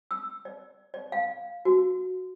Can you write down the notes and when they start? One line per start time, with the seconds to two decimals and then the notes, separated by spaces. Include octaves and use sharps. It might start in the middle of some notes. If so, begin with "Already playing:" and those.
0.11 E6
0.45 D5
0.94 D5
1.12 F5
1.65 F#4